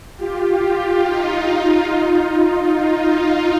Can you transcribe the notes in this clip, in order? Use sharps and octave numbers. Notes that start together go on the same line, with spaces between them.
F4 G4
F4 G4
D#4 F4